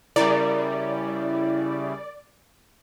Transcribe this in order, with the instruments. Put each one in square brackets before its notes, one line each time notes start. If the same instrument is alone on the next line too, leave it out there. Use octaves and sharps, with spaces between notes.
[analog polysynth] C#3 G3 [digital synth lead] E4 [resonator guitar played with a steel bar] A#4 [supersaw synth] D5